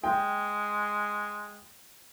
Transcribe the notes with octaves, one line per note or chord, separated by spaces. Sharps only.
G#3 G5